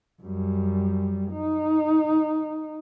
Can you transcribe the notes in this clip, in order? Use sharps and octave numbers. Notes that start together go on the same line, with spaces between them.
F#2 G3
D#4